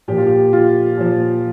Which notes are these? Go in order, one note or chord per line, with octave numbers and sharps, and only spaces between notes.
A#2 F3 G4
F4
G4
F4
A#2 F3